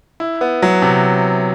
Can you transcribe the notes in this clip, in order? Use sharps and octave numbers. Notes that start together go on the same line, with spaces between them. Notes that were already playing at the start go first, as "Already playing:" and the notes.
E4
B3
F#3
C3